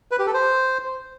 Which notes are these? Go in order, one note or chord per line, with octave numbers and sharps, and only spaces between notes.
B4
G4
A4
C5